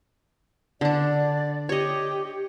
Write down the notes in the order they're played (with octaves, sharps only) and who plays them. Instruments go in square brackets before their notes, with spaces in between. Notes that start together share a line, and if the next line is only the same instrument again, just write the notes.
[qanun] D3 D4 [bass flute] D5
[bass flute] G4 [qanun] C#5 D#5